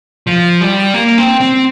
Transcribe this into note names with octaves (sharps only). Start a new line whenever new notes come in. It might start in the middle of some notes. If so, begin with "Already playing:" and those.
F3
G3
A#3
C4
C4